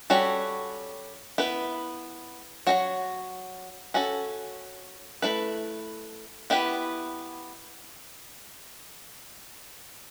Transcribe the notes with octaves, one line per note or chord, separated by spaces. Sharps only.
G3 C#4 F#4 A4 C#5
B3 E4 B4
F#3 C#4 F#4 C#5
C#4 F#4 A4
A3 E4 B4
B3 E4 G4 B4